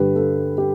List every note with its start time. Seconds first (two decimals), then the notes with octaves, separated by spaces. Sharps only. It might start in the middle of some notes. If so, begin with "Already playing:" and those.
Already playing: G2 D3 G4 B4
0.16 A4
0.58 G4